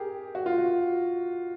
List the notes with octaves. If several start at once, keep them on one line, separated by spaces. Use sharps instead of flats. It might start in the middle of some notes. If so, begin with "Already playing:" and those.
Already playing: G4 G#4 A#4
F#4
F4
F#4